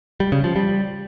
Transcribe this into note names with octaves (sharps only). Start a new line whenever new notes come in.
G3
C#3
F3
G3